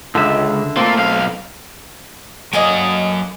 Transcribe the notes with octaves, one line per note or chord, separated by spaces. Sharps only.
C#2 D3 E5
A3 A#3 C4 F4
B1 F5
A2 F#3 A#3 D#5 G#5